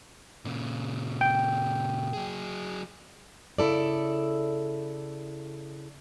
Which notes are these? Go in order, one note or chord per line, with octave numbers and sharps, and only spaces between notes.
A#2 C#3
G5
F#3 G#4
C#3 E4 A4 D5